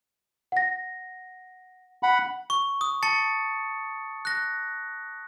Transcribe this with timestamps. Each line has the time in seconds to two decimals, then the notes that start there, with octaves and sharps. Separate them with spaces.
0.52 F#5 A#6
2.03 F#5 B5
2.50 C#6
2.81 D#6
3.03 A5 A6 C#7
4.25 F#6 A#6